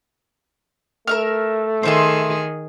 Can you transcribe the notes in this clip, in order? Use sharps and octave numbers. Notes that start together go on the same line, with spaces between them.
A3 A#4 E5 F6
D#3 G#4 C5 E5 C6